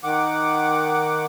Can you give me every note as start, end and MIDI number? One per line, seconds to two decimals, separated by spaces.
0.04 1.26 51
0.04 1.26 78
0.04 1.26 86